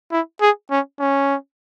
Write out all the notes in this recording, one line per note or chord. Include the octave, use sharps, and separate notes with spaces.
E4
G#4
C#4
C#4